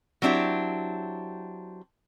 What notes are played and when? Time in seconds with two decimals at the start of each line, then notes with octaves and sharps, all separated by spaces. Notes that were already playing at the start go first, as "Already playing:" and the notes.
0.22 F#3 C4 D4 E4 G4